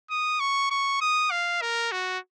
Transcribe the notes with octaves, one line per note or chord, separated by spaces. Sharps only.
D#6
C#6
C#6
D#6
F5
A#4
F#4